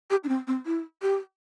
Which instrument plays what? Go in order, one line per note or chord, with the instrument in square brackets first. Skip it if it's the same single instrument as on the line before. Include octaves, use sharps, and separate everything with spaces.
[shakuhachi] G4
D4
C4
C4
E4
G4